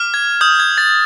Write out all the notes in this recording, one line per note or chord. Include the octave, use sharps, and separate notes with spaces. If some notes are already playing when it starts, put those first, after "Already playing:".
Already playing: D6 F6
G#6
D#6 G6
G#6
A6